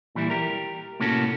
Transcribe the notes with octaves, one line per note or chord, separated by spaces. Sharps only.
A#2 E3 G3 E4
G4 A#4
A2 C3 A#3 C#4 F#4 A4